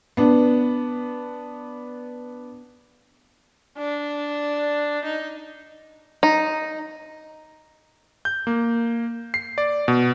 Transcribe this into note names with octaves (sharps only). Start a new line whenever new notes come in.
B3 D4
D4
D#4
D#4
G6
A#3
C7
D5
B2